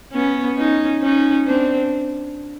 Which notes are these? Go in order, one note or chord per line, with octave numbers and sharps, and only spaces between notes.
B3 C#4
C#4 D#4
C#4 D#4
C4 D4